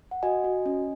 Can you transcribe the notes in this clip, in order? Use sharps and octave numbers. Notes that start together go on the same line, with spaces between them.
F#5
F#4 D#5 G#5
F#4
C#4